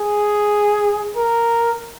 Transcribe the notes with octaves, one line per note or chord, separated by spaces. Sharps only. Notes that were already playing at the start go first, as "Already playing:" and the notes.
Already playing: G#4
A#4